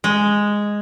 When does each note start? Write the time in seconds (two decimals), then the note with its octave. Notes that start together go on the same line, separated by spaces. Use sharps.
0.04 G#3